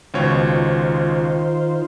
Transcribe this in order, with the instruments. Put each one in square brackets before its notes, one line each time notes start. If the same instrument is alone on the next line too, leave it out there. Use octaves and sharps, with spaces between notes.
[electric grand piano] C#2 B2 C#5 [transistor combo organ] D#3 F4 C5